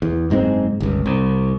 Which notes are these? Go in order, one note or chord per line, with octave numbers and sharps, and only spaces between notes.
E2
F#1 G#2 G#3 C4
G1 C#2
C2